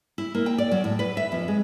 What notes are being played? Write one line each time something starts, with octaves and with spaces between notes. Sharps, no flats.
E4
A#3
G5
D5
F#3
A2
B4
E5
F2
G#3